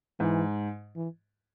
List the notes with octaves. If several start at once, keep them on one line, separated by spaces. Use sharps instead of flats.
G#2 E3
E3